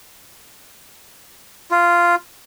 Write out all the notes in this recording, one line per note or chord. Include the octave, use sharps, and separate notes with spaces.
F4